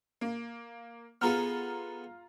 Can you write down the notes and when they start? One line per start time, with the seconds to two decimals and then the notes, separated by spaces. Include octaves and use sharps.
0.21 A#3
1.21 B3 F4 G#4 A4 A#5 F6